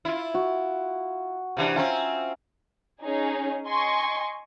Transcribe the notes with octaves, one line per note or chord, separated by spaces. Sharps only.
E4 F4
F#4
C3 E3 D4
C4 C#4 F4 E5 G#5 A#5
C#4 D#4 G#4
D#5 G#5 C6 C#6